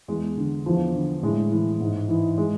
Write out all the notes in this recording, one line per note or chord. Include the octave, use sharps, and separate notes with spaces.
E2 G#3
D3
E2 F3
D3
A2 G#3
E3
G#2
E3
G#3